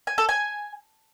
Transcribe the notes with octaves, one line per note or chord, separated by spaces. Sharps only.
G#5
A4
G#5